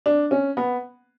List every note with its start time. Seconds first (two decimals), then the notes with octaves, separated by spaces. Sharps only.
0.06 D4
0.31 C#4
0.57 B3